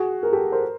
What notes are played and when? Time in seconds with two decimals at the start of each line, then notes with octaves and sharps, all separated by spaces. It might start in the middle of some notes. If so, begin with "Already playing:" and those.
Already playing: F#4 G#4
0.23 G#4 A#4
0.33 G4 A4
0.52 A#4 C5